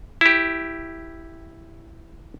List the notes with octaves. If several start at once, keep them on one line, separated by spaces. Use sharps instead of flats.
E4 G4